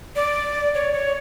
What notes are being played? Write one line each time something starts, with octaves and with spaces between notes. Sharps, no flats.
D5
C#5
C#5